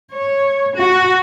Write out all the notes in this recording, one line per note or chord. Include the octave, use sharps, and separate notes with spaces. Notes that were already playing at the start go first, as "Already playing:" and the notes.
C#5
F#4